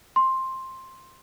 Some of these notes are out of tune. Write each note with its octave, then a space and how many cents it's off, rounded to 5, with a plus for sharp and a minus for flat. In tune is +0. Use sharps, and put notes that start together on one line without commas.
C6 +10